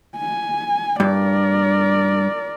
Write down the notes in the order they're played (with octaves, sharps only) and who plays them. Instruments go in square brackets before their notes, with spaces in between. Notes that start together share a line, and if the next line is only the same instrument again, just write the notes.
[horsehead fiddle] G#5
[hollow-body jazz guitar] G2 [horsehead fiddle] A#4 D5